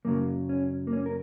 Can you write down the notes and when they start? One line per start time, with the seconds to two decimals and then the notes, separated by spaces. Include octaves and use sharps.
0.05 F#2 C#3 F#3 A#3
0.49 C#4
0.87 A#3
0.93 C#4
1.06 A#4